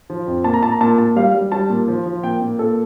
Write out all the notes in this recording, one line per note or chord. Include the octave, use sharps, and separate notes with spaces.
F3
F2
A#2 A5
A#5
A#2 A5
A#5
A#2 A5
A#2 A5
G3 F5
G3
G3 A5
A#2
F3
F3
A#2 G5
A#2
A#2 A4